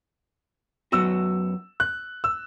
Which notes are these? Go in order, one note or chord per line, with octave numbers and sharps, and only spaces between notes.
F#2 F#3 B3 F#4 E6
F#6
E6